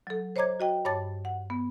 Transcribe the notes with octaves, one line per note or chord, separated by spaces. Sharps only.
F#3 A4
C5 C#5 D#5 A#5 D6 G#6
F#4 D#5 G5
G2 C#5 A5 D6 A6
F#5
B3